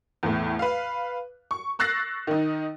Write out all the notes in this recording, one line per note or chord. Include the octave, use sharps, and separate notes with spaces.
E2 A2
B4 F5
C#6
C#6 E6 F#6 A6 A#6 C7
D#3 D#4